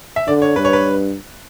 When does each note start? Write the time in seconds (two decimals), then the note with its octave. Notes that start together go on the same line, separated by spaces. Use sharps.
0.16 E5
0.27 D3 D5
0.42 C#5
0.56 G2 B4
0.65 C#5
0.73 B4